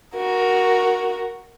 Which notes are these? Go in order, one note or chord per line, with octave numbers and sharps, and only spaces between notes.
F#4 A#4